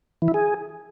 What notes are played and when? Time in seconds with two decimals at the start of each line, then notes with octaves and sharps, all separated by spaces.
0.22 E3
0.28 E4
0.34 G#4